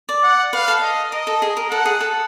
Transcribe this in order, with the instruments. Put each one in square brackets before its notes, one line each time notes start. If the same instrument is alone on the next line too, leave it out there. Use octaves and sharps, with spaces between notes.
[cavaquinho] D5
[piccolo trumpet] F#5
[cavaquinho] B4 [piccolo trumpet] F5
[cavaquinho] A4
[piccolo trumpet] D#5
[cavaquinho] A#4 [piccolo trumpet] D#5
[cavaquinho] A4
G#4
A#4
[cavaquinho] A4 [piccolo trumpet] F#5
[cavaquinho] G#4
A4